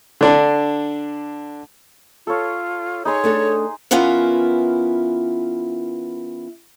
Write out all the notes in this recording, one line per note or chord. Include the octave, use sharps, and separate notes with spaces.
D3 D4
F4 A4 C#5
D#4 G#4 C#5 C6
A3 D4 A4
E3 B3 C#4 E4 F4 A#4